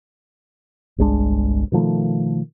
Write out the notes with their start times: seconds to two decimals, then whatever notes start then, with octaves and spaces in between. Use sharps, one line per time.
0.98 G1 C2 G#3 D4
1.72 B2 D#3 F3 A3